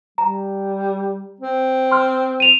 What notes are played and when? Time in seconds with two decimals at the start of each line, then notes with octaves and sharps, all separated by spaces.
0.18 G3 A#5
1.41 C4
1.91 C6 F6
2.40 D#7 F7